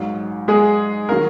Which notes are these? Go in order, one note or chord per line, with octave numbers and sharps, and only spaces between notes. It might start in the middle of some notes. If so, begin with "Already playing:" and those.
Already playing: A#1 G#2 F#3
G#3 G#4
D#3 F#3 A#3 A#4